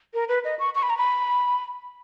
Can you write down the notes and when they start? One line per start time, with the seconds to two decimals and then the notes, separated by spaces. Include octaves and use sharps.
0.14 A#4
0.28 B4
0.45 D#5
0.59 C#6
0.75 C#6
0.83 B5
0.90 A#5
0.97 B5